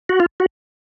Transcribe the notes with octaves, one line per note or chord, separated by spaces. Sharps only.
F#4
F4
F#4